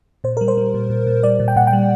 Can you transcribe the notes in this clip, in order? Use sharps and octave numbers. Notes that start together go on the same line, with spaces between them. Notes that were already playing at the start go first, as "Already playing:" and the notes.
A#2 C5
G3 A#4
C5
G3
A#2
A#2
A#2
G3 D5
A#2
G5
A#2 F#5
G5
G3